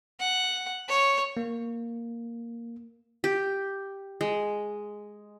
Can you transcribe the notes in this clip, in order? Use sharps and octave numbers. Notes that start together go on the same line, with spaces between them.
F#5
C#5
A#3
G4
G#3